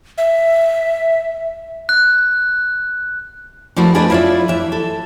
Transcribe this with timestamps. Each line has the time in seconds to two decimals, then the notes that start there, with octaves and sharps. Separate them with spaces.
0.18 E5
1.89 F#6
3.76 F3 A3 A#3 D4 E4 F#4
3.95 D4 G#4 A4 B4 D5 D#5
4.10 E4 F4 C#5 D5 E5
4.48 E3 E5
4.72 A4